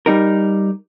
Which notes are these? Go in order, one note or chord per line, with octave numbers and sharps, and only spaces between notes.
G3 D#4 A#4